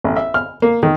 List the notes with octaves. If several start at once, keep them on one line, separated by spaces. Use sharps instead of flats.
A1
E5
F6
A#3
D#3